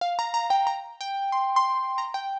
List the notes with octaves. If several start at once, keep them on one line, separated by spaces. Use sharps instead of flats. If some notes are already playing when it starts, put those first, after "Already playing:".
F5
A#5
A#5
G5
A#5
G5
C6
C6
A#5
G5